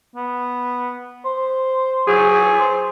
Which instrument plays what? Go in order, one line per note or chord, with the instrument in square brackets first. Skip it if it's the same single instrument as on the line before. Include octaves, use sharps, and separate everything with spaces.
[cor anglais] B3
C5
[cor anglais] F#3 [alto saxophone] G#4
[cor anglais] C5